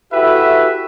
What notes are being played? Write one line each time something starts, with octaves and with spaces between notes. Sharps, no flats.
E4 F#4 G4 A4 B4 E5